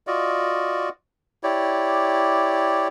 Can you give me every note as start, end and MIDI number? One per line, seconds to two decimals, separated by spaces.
0.07 0.89 65
0.07 0.89 66
0.07 0.89 74
0.07 0.89 75
1.43 2.88 64
1.43 2.88 67
1.43 2.88 73
1.43 2.88 74